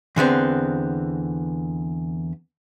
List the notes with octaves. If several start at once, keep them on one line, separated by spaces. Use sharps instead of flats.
E2 D3 B3 C4